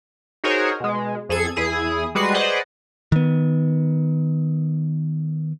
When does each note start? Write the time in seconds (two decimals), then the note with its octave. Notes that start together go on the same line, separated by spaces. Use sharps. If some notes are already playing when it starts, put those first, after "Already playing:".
0.44 D#4 F#4 G#4 A#4 C5 C#5
0.80 B2 G#3
1.29 F2 G#4 A4 G#6
1.56 E2 E4 G#4 D#6
2.15 G3 G#3 F#4 B4 C7
2.34 G#4 B4 C5 D5 D#5 F#5
3.12 D#3 B3